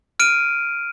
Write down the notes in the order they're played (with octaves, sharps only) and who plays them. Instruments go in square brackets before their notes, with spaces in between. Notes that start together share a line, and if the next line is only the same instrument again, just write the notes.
[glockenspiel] F6 D7 D#7